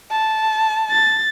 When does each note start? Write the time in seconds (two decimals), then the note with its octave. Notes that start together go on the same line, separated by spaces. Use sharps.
0.11 A5
0.90 A6